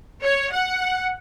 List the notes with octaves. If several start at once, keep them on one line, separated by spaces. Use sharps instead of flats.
C#5
F#5